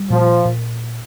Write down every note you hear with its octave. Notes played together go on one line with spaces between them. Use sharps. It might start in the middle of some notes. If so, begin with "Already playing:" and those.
Already playing: G3
A#2 F3
A#2